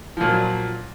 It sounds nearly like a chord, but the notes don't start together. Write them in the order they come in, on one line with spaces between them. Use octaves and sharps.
F3 A#2 F#3